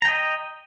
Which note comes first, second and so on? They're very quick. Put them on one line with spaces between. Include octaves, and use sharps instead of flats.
A#5 G5 D#5